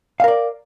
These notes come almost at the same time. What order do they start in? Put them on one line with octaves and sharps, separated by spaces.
F5 A#4 D5